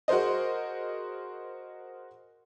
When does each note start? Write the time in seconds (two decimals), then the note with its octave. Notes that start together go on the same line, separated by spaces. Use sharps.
0.08 F#4 G#4 A#4 C5 D#5